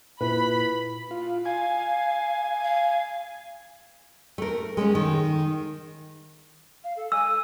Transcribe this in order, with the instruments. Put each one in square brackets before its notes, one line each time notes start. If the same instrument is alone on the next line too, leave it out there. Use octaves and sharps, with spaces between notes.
[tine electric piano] A#2 E4 [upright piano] B4 [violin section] B5
[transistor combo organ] F4
[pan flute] F5 [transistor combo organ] G#5
[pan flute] F5
[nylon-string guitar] A3 A#4
G#3 A3 C#4
D#3
[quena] F5
A4
[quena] G#5 [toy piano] E6